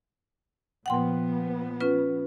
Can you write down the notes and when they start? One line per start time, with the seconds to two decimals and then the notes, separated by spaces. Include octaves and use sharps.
0.86 A#2 F3 B3 F#5 G5 C6
1.81 C#4 F4 B4